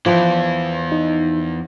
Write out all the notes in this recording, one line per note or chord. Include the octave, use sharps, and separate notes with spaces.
E2 E3 F3 B4 G5
D#4